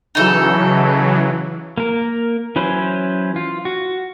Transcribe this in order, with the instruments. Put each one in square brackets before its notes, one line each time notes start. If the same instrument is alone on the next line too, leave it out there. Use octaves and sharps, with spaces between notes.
[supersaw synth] C#3 E3 F#3 [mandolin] D#4 A4
[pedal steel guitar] A#3 A#4
E3 F#3 C#4 B4 C5
F4
F#4